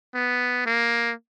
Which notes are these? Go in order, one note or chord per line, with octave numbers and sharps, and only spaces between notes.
B3
A#3